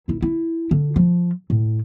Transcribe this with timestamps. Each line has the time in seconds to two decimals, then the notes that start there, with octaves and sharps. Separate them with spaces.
0.08 D#1 E4
0.22 E4
0.71 D3
0.96 F3
1.50 A2